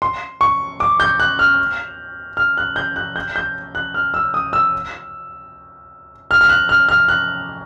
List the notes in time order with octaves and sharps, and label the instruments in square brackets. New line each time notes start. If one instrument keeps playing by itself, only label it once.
[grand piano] C6
C#6
D6
G6
F#6
F6
F6
F#6
G6
F#6
G6
G6
F#6
F6
E6
D#6
E6
F6
F6
F#6
F6
F6
F#6